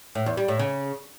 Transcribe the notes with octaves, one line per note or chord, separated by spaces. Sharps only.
A2
E2
G3
A2
C#3